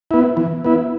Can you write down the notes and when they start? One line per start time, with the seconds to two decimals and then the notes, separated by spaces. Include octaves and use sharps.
0.11 B3 E4
0.37 E3
0.64 B3 E4